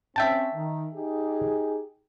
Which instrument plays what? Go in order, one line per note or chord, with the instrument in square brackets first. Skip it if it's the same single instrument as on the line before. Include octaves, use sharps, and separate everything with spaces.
[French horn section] C4 C#4 [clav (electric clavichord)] E5 G5 A5
[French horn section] D#3
D#4 G4 G#4